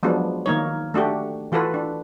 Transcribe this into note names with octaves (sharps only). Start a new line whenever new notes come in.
F3 F#3 G#3 B3 D4
D#3 A#3 D#4 C#5
A3 D4 F#4 G4
E3 F4 F#4 A4 B4
D4